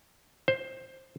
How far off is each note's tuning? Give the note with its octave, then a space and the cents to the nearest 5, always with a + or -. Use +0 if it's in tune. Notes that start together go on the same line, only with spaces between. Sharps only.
C5 +10